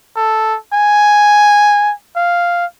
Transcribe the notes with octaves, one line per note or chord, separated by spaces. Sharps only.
A4
G#5
F5